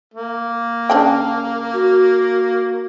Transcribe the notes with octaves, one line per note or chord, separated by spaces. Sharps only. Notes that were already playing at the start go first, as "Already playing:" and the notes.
A#3
C#3 D4 G5
F#4